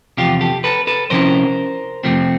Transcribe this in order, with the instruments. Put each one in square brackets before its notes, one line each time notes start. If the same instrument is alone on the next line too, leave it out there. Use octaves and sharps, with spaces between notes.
[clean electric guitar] E2 C3 F3 F4 G4
G4 A4
A4 B4
A4 B4
C3 F3 A3 C#4 E4 A#4 C5
F2 C3 F3 A3 C4